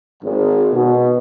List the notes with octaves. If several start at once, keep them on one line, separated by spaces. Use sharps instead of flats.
G#1
B2